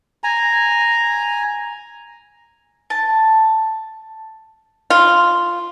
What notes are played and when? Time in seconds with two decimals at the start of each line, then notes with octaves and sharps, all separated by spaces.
0.24 G#5 A#5
2.90 A5
4.90 F4